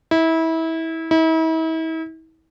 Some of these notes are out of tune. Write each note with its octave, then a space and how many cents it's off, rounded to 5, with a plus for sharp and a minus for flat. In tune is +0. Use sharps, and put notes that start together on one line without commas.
E4 -25
E4 -40